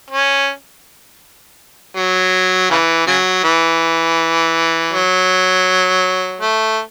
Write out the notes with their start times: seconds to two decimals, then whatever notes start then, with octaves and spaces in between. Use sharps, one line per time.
0.10 C#4
1.96 F#3
2.70 C#3 E3
3.07 C#3 F#3
3.44 E3
4.93 F#3
6.41 A3